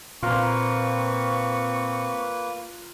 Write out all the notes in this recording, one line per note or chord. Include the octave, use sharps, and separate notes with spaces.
A#2 A#3 C4 F4 B4 A#5 C#6